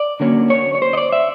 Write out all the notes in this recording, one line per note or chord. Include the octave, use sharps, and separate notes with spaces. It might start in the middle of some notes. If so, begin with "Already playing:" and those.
Already playing: D5
D3 F#3 A#3 C#4
C#5
C#5
C5
D#5
D5
E5